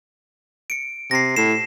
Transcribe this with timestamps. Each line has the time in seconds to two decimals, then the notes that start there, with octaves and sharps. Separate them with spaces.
0.70 C#7 D7
1.11 C3 A#6 C7
1.36 A2 C7 E7